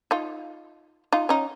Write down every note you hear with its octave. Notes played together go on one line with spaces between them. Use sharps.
D#4 F4
D#4 F4
C#4 D#4